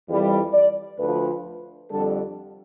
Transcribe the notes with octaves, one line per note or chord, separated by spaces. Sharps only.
F2 E3 G3
D5
D2 D3 F3 B4
F2 D3 G3 A4